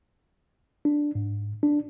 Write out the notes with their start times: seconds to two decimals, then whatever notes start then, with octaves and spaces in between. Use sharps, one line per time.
0.85 D4
1.15 G#2
1.63 D4